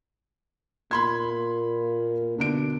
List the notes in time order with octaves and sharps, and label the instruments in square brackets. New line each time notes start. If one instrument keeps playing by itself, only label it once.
[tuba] A#2 [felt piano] B5 C6 G#6
[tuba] B2 [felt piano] D3 D4 D7